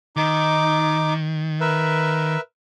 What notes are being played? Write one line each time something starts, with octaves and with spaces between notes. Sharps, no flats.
D#3 D#4 D6
A#4 B4 E5